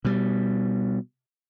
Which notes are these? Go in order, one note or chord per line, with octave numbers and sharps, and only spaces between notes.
B2 G3